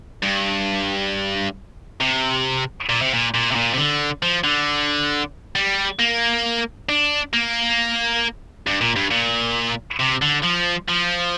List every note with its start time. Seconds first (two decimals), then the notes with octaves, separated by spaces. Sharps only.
0.22 G2
2.00 C3
2.89 A#2
3.02 C3
3.13 A#2
3.34 A#2
3.51 C3
3.56 A#2
3.74 C3
3.78 D3
4.23 F3
4.44 D3
5.56 G3
5.99 A#3
6.89 D4
7.33 A#3
8.67 G2
8.81 A#2
8.96 G2
9.11 A#2
9.99 C3
10.22 D3
10.44 F3
10.89 F3